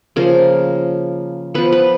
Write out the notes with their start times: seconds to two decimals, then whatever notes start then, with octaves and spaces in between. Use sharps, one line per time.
0.16 C#3 F3 A#3 A#4
1.54 F3 B3 B4
1.72 B4